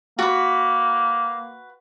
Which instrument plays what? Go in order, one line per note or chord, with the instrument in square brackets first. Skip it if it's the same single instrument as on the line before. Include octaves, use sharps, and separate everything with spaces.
[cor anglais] A#3 [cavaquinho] F#4 B4